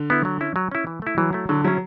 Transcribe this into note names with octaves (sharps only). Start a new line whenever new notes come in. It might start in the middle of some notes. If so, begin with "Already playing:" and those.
Already playing: D3
B3 E4
F#3
C#4 E4
F#3
C#4 E4
E3
A3 E4
E3 F#3
A3 E4
D3 F#3
F#3 C#4 E4